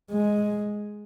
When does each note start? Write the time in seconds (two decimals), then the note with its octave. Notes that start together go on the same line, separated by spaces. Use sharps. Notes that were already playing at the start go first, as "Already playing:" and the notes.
0.11 G#3